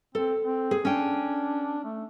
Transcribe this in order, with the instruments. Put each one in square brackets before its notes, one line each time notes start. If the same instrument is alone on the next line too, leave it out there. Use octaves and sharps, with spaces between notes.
[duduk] C4 [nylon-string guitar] A4
[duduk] C4
[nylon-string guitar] G#4
[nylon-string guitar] C#4 G5 [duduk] D4
[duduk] A3